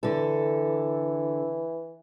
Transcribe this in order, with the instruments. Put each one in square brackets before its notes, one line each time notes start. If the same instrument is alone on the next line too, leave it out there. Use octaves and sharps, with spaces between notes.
[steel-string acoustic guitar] D3 A4 [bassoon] E3